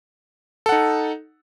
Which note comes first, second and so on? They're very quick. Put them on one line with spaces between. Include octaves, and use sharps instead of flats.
A4 F#5 D#4